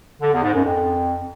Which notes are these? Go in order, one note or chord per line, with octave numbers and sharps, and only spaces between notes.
D3
E2
G#2
F#2
F2